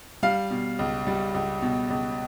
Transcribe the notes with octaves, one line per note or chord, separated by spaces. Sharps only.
G3 F5
B2
C#2
G3
C#2
B2
C#2